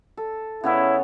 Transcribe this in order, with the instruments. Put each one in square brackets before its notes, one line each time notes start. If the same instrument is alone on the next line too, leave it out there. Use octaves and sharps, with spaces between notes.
[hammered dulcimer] A4
[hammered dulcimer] C#3 B3 C#4 [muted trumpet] E4